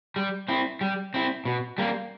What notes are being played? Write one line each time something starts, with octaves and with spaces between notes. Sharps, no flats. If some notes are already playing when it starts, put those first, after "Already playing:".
G3
C4 E4
G3
C4 E4
B2
G3 A#3